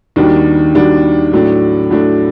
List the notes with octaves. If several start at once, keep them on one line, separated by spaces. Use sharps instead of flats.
D#2 D#3 G3 D4 F#4
D#2 D#3 G3 D4 F#4
A2 F#3 A3 D4
A2 F#3 A3 D4